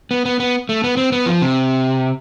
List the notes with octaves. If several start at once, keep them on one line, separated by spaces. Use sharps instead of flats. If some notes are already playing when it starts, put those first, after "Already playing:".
B3
B3
B3
A3
B3
C4
B3
F3
C3